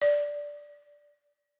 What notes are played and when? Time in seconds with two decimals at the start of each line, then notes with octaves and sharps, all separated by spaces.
0.02 D5